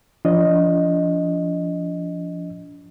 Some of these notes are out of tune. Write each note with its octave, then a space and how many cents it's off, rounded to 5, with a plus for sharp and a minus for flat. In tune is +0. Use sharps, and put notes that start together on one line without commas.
F3 -20 D4 -35 D#5 +0